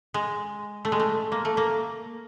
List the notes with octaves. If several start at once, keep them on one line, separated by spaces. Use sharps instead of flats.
G#3
A3
G#3
A3
A#3
A3
A#3